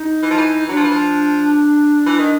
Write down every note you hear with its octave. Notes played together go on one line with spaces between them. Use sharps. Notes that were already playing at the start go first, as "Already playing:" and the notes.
Already playing: D#4
E3
F3
E3
F#3 D4
F3
E3
F3
E3
D#3